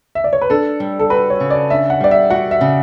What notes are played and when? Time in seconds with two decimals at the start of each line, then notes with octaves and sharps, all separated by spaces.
0.15 E5
0.24 D5
0.33 C#5
0.41 B4
0.50 D4 A4
0.80 G3
1.00 A4
1.10 F#4 B4
1.30 C#5
1.40 C#3
1.50 D5
1.70 D4 E5
1.90 F#5
2.00 G3 D5
2.11 E5
2.30 F#4 F#5
2.51 E5
2.61 C#3